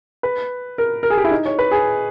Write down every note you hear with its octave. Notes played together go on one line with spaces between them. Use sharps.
B4
A#4
A#4
G#4
G4
E4
D#4
C#5
B4
G#4